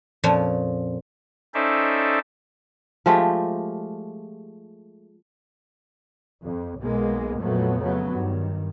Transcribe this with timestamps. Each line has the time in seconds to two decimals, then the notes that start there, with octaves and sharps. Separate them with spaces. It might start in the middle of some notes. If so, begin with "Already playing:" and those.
0.24 F2 A#2 F3 C#4
1.54 C#4 D#4 A4 C5 D5 E5
3.06 F3 G#3 A3 G4
6.42 F2
6.81 B1 G#3 A#3 B3
7.39 F2 A#2 F3 F#3 A3 B3
7.80 C#3 F#3 B3
8.11 G2 D#3